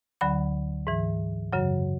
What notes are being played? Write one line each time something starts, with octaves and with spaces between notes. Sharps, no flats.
D2 D3 F#3 B5
G#2 E3
F#2 C#3 F#3